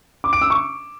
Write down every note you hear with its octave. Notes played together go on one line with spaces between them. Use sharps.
D6
D7
E6
C#6